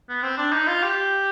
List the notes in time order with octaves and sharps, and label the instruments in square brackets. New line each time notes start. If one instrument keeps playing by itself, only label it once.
[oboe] B3
C4
D4
D#4
F4
G4